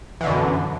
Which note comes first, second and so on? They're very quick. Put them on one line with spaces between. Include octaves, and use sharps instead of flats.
E3 D3 B2 F#2